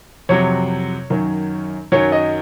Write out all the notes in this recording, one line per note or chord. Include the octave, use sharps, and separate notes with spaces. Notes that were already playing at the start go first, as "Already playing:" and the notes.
F2 C3 F#3 C#5
F#2 D#3 F#3
F#2 D#3 F#3 C#5
D#5